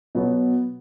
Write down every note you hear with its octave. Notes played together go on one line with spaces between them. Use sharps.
B2 F#3 B3 F#4